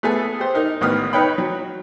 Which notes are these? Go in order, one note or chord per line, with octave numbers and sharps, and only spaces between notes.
A3 B3 G#4 A4 G#5
G4 C5
D#4 A#4
A1 D#3 B3 D#6 F6
D#4 B4 C#5 G5 B5
F#3